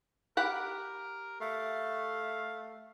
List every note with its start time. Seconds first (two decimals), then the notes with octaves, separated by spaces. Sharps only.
0.37 G4 A#4 F#5 B5
1.41 A3 F5